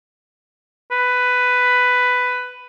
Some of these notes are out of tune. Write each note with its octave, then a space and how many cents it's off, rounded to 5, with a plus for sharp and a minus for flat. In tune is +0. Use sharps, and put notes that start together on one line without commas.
B4 +10